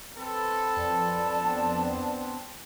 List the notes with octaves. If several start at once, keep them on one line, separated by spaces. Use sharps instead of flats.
C4 A4 B4
F2 D5 A5
B3 C4 D4